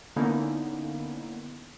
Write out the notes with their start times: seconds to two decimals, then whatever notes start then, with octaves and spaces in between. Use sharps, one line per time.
0.16 D3 A#3 B3 C#4 D#4 E4